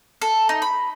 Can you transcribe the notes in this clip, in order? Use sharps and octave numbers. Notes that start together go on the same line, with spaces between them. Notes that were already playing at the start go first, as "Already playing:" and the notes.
A4
D#4
B5